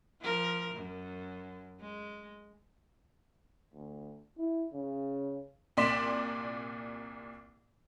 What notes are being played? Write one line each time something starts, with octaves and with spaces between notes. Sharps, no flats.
F3 A#4
F#2
G#3
D2
E4
C#3
C2 A#2 D5 C6 B6 E7